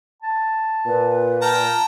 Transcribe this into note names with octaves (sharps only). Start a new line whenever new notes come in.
A5
A#2 B4
G5 A5 A#5 F6